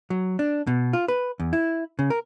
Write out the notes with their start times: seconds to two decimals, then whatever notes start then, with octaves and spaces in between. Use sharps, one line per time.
0.10 F#3
0.39 D4
0.67 B2
0.93 F4
1.08 B4
1.40 E2
1.53 E4
1.99 C#3
2.10 A#4